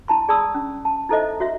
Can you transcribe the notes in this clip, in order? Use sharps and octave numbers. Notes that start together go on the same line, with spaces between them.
E4 A5 C6
G#4 D5 A5 B5 D#6 E6
C#4
A5
D#4 E4 A4 C5 D#5 E5
F#4 C#5 E5